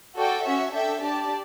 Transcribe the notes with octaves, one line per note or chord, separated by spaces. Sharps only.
F#4 A4 D5 G5
C#4 F#4 C#5 E5
D4 A4 E5 G5
D4 G4 D5 A5